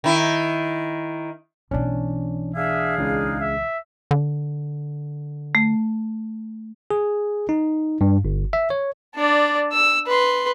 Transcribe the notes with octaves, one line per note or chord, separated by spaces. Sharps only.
D#3 E4
B1 E3 C#4 D4
D4 G#4 E5 F5
C#2 C#3 G#3 D#4
E5
D3
A3
G#4
D#4
G2
G1
E5
C#5
D4 D5
E6
B4 C6